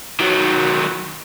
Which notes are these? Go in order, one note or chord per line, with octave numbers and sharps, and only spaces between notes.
D#3 F#3